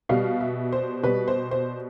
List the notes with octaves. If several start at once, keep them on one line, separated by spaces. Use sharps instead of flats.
B2 G3 F5
E5
C5
B2 G3 B4
C5
C5